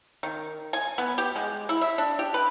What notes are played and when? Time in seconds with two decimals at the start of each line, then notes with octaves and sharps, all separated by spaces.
0.23 D#3
0.73 G#5
0.98 B3
1.18 G4
1.36 G#3
1.69 E4
1.81 E5
1.98 D4
2.19 G4
2.34 B4